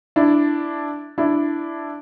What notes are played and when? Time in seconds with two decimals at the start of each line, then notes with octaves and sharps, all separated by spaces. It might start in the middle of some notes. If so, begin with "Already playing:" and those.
0.16 D4 E4
1.18 D4 E4